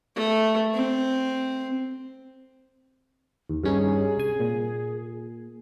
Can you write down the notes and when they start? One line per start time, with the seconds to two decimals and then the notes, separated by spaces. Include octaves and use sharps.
0.16 A3
0.74 C4
3.50 D#2
3.64 G2 C#4 D#4 G#4
4.17 C2 G#5
4.40 A#2